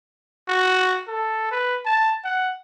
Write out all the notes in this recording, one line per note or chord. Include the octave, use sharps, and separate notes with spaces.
F#4
A4
B4
A5
F#5